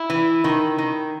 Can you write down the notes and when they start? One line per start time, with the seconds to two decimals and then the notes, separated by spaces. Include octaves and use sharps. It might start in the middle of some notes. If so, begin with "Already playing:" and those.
Already playing: E4
0.10 E3
0.44 D#3
0.78 D#3